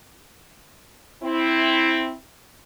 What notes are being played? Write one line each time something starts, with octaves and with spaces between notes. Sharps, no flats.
C4 E4